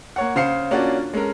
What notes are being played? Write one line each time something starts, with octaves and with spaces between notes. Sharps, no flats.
A#3 C#5 F#5
C#3 C5 F5 C7 C#7
A#3 C#4 D4 F4 F#4
G#3 C#4 A4 A#4